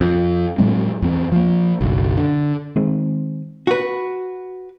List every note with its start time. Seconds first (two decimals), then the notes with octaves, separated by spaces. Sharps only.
0.01 F2
0.58 A2 F#3 G#3 C4
1.02 E2 C4
1.32 F3 A#3
1.81 F#1 B1
2.17 D3
2.76 D#3 G#3 C4
3.67 F#4 B4